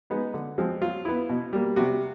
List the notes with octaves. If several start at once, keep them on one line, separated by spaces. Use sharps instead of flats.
G#3 B3 D#4
D3
F3 G#3 C4
F#3 F4
B3 E4
B2
G3 A#3
C3 F#4